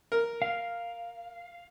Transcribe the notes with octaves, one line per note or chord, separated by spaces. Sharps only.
A#4
F5